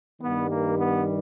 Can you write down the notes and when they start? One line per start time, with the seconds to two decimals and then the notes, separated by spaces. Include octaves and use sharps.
0.21 G2 D#3 G3 B3
0.49 A#3
0.78 B3